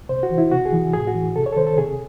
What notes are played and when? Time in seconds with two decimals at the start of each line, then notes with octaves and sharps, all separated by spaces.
0.09 C3 C5
0.23 F#4
0.31 E3
0.38 E4
0.51 C3 F#4
0.66 G#4
0.72 E3
0.94 A2 G#4
1.07 F#4
1.15 E3
1.36 C3 A4
1.46 C#5
1.53 A4
1.56 D#3 C5
1.67 A4
1.78 C3 G#4